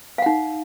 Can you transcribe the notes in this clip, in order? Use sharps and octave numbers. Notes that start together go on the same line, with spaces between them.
D#4 F5 F#5